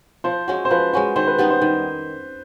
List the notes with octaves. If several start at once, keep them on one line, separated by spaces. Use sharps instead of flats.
F3 C5
G#3 C#4 F#4
C5
F3 B4
G#3 C#4 F#4
D#3 C5
B4
G3 B3 D#4
C5
D#3